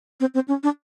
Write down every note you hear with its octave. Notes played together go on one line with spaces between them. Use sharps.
C4
C4
C#4
D4